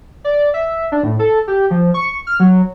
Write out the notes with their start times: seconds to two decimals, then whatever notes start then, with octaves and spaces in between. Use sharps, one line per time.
0.24 D5
0.54 E5
0.92 D4
1.03 A2
1.19 A4
1.48 G4
1.71 F3
1.94 C#6
2.27 F6
2.40 F#3